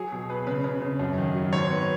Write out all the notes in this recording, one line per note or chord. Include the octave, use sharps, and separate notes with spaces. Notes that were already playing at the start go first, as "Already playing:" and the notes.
Already playing: F#3 G#4
B2
B3 B4
C#3 B4
C#3
C#3
F#2
D#3
F#3
G#2 C#5
B3